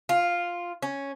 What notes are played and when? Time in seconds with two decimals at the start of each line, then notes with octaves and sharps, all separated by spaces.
0.09 F4
0.82 C#4